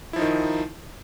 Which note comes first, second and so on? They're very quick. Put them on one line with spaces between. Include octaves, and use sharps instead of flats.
E4 F3 D#4 D#3